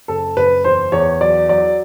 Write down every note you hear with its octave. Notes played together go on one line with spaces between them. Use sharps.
F#1 A4
F#1 B4
E2 C5
E2 C#5
F#3 D5
F#3 D5